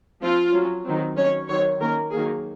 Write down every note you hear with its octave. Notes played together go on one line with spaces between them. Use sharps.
F3 C4 F4
F#3 C#4
D#3 F#3 C4
D#3 F#3 C#4 C#5
D#3 F#3 C4 C#5
D#3 A#3 C#4 A#4
D#3 F#3 A#3 G#4